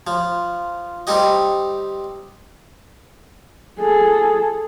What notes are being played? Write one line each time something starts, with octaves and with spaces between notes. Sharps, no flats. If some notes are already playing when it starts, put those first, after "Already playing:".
F3
G3 C4 D#4 G4 D#5
G#4 A4